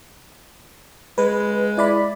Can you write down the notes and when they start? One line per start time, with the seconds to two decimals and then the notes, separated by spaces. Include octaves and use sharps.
1.18 G#3 B4
1.78 E4 D5 B5